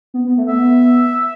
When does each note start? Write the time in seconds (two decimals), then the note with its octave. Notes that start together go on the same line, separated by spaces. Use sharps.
0.14 B3
0.26 B3
0.38 A3
0.48 B3 E5